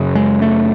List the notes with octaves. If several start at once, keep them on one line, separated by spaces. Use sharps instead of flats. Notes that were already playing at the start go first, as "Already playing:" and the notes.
Already playing: F#2 C#3
G#3
A3